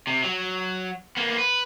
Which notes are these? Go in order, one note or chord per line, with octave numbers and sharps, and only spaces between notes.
C3
F#3
A#3 B3
B4